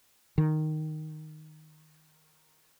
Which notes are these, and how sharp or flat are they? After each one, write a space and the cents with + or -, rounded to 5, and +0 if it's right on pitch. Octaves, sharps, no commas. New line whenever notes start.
D#3 -5